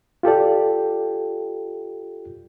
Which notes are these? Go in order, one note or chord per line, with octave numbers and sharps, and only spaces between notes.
F4 G4 A4 D5